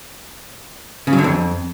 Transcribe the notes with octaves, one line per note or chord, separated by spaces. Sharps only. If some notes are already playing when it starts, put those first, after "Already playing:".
C#3
F#3
D3
F2